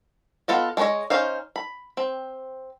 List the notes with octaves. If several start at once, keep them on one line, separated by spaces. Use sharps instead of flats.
B3 F4 A4 D#5
G#3 A4 B4 C#5 D#5
C#4 D#4 C5 F5
B5
C4